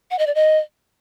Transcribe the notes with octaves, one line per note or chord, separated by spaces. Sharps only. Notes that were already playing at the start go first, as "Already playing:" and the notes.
F#5
D#5
D5
D#5